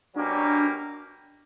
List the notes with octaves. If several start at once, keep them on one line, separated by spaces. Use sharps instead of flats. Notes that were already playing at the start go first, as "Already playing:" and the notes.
B2 F#3 A#3 C#4 D4 G4